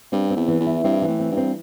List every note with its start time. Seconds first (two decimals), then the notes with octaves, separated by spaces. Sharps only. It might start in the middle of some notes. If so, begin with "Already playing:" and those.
0.12 G2 C4
0.30 C4
0.36 E2
0.48 E3
0.60 E2
0.66 E4
0.84 G2 C4
1.02 E3
1.07 A2
1.19 C4
1.31 G2
1.37 C4